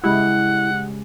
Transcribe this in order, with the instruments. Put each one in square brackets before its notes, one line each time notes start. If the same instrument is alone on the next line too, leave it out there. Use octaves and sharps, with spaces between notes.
[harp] C#3 G#3 G4 [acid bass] E4 [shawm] F#5